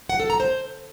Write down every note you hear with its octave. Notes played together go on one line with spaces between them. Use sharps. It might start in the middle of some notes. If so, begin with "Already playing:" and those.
F#5
A4
A#5
C5